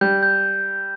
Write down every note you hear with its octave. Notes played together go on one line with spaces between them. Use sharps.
G3 G6
G6